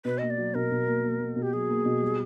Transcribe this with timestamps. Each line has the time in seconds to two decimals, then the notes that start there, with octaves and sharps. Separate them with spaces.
0.05 B2 B4
0.18 A#3 D#5
0.30 D5
0.38 F#3
0.54 B2 A#4
0.71 B2
0.87 A#3
1.04 A#3
1.20 A#3
1.36 B2
1.42 G4
1.53 F#3 G#4
1.69 A#3
1.85 B2
2.02 G3